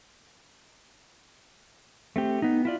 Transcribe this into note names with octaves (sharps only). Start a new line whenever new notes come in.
A3 C4 G4
B3 D#4
E4 F4 D5